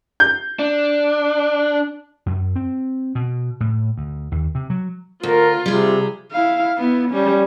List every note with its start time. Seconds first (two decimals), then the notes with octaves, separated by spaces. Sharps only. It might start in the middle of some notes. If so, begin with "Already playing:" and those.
0.20 G6
0.59 D4
2.26 F#2
2.55 C4
3.15 B2
3.60 A2
3.98 D2
4.32 D#2
4.55 C3
4.70 F#3
5.23 D2 F4 A#4
5.66 C3 G3 G#4
6.33 E4 F5
6.78 B3 E4
7.11 G3 C#4